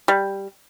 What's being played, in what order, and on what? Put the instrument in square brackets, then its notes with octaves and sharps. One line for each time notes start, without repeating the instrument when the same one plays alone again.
[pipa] G3